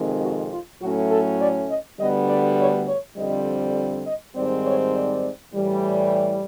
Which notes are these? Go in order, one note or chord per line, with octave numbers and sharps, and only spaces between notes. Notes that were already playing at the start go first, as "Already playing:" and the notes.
Already playing: F2 C3 D#3 G#3
F#4
F4
A2 F#3 A3 C#4 F#4
A4
D5
D#5
D2 D3 G3 B3 D#5
D5
C#5
C#5
F2 D3 G3 C4 D#5
D#5
G#2 D#3 G3 C4 D5
C#5
D5
A2 E3 G3